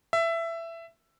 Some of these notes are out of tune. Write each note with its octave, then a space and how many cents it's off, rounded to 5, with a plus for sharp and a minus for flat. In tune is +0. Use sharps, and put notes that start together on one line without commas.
E5 +15